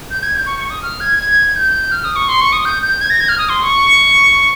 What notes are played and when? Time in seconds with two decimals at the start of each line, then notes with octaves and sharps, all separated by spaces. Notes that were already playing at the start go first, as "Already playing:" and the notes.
0.11 G6
0.23 G#6
0.35 G6
0.46 C#6
0.59 C#6
0.70 D#6
0.82 F6
1.01 G#6
1.19 G#6
1.56 G6
1.92 F6
2.04 D#6
2.16 C#6
2.29 C6
2.41 C#6
2.52 D#6
2.65 G6
2.83 G6
3.01 G#6
3.10 A#6
3.20 G#6
3.29 F6
3.38 D#6
3.49 C6
3.62 C#6